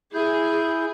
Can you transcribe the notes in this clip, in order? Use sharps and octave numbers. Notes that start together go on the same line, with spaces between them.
E4 G#4 G6